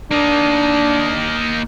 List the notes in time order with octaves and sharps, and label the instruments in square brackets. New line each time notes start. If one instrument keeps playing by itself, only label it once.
[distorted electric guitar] A#3 D#4 [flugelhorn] D4